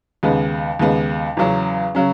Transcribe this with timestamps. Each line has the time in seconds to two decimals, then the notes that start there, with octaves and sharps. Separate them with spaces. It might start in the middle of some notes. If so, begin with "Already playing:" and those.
0.23 D#2 C#3 G#3 B3
0.79 D#2 C#3 G#3 B3
1.37 E2 C#3 F#3 C#4
1.95 C#3 F#3 C#4